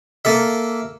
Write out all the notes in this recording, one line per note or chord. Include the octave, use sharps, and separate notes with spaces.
A#3 A4 E5